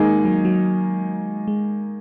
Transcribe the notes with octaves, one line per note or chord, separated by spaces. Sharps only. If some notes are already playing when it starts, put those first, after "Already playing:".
Already playing: D#3 G#3 A#3 D#4 G#4
F#3
F#3
G#3